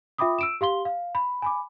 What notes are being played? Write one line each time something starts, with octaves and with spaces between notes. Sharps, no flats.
F4 E5 G5 B5 D6 D#6
E6 D7 E7
G4 F5 C6 G7
F5
B5
G#5 B5 D6